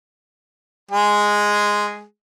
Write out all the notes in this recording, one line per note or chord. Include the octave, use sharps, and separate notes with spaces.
G#3 G#4